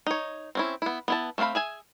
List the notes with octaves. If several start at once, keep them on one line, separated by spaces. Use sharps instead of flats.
D#4 C#5
C4 C#4 E4
B3 E4
B3 E4 A5
A3 C4 F4 F5 B5
G#4 E5 G#5